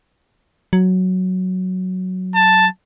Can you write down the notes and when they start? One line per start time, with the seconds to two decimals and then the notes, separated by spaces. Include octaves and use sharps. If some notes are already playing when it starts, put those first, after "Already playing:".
0.73 F#3
2.35 A5